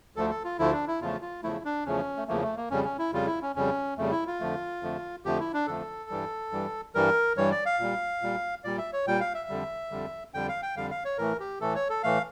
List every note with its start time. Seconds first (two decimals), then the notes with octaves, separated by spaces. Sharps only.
0.16 D2 D3 F3 A3 A4
0.30 A4
0.44 F4
0.59 D2 D3 F3 A3 E4
0.72 D4
0.87 E4
1.01 E2 C#3 F3 A3 F4
1.22 F4
1.43 E2 C#3 F3 A3 E4
1.65 D4
1.86 E2 C#3 F3 A3 C#4
2.17 A3
2.28 E2 C#3 F3 A3 A#3
2.43 A3
2.56 A#3
2.70 F2 C#3 G3 C#4
2.84 C#4
2.99 E4
3.13 F2 C#3 G3 F4
3.27 E4
3.42 C#4
3.56 F2 C#3 G3 C#4
3.97 F2 C#3 G3 A3
4.12 E4
4.27 F4
4.40 F2 D3 F3 A3
4.82 F2 D3 F3 A3
5.25 F2 D3 F3 A3 G4
5.39 E4
5.54 D4
5.67 F2 D3 F3 A3 A4
6.10 G2 E3 G3
6.52 G2 E3 G3
6.95 G2 E3 G3 A#4
7.37 G2 E3 G3 C#5
7.52 D5
7.66 F5
7.79 A#2 G3
8.22 A#2 G3
8.64 A#2 G3 D5
8.78 E5
8.93 C#5
9.07 A#2 G3 G5
9.20 F5
9.34 E5
9.49 F2 D3 G3
9.91 F2 D3 G3
10.34 F2 D3 G3 G5
10.48 F5
10.62 G5
10.76 F2 D3 G3 F5
10.91 F5
11.05 C#5
11.18 A2 E3 A3 A#4
11.40 G4
11.61 A2 E3 A3 A4
11.75 C#5
11.89 A4
12.03 A2 E3 A3 F5